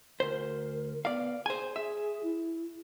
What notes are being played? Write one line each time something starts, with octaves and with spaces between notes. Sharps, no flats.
D2 A#4 C5
B3 D5 F5
G#4 C5 G#5
G#4 E5
E4